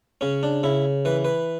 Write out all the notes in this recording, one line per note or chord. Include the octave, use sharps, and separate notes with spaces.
C#3 C#4
D4
C#3 E4
E3 B4
B4